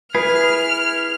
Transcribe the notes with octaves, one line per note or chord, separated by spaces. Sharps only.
E4 G#4 B4 F6